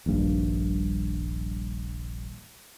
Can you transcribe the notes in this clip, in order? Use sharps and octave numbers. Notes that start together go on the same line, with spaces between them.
D#1 A#1 G2